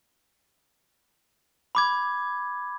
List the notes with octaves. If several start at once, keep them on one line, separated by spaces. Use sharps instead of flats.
B5 D6 G#6